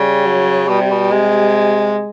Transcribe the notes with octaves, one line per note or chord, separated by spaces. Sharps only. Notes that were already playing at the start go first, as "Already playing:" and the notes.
Already playing: C#3 G3
F#3
B2 G3
C3
B2
C3 G#3